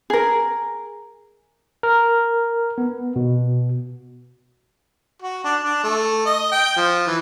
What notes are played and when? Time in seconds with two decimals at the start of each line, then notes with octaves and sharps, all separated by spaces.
0.10 G#4 A#4
1.83 A#4
2.78 B3
3.16 B2
5.22 F#4
5.44 D4
5.63 D4
5.84 A3
6.26 D#5
6.52 G5
6.76 F3
7.07 E3